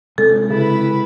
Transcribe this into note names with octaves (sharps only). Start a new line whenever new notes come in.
C3 G#3 A4
C#3 E4 B4